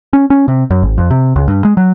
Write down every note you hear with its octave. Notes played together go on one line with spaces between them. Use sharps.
C#4
C#4
C3
F#2
G#1
F2
C3
C#2
G2
G#3
F#3